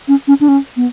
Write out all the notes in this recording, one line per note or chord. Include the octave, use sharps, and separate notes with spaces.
C#4
C#4
D4
C#4
B3